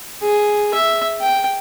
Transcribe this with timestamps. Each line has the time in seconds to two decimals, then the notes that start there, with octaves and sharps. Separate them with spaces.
0.22 G#4
0.74 E5
1.21 G5